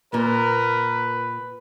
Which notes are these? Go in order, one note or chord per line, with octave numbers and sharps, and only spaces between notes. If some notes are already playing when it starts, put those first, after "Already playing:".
A#2 A#4 B4